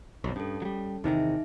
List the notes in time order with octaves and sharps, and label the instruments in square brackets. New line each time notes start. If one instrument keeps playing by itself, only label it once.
[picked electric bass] B1 F2
[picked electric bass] G2 [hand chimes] C#4 A4
[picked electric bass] F#3 G3
[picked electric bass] E2 C3 D#3 [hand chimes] D#4 G#4 E5